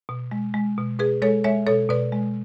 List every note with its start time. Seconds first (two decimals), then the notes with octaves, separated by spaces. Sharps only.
0.09 B2
0.31 G#3
0.54 G#3
0.78 B2
0.99 B2 G#4 B4
1.22 G#3 A4 C#5
1.44 G#3 C#5 E5
1.67 B2 A4 C#5
1.89 B2 B4 D5
2.12 G#3